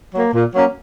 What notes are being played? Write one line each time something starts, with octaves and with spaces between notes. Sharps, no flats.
F#3 A#3
A#2
F#3 A#3 C#4